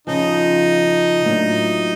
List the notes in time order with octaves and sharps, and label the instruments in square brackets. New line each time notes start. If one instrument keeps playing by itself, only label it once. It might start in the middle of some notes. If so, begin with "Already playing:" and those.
[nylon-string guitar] F2 C#3 F3 [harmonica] D#4
[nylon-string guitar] A2 F#3 A#3 D4 F4